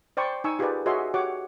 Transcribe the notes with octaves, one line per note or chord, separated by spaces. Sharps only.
C5 D5 G5 B5 C#6
D#4 G#5 C#6 E6
F4 G4 G#4 A#4 B4 D5
F#4 G#4 C#5 D#5 E5 C6
F#4 G4 C#5 F#5 D6